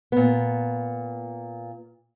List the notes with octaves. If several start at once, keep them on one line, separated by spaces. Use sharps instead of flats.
A#2 B3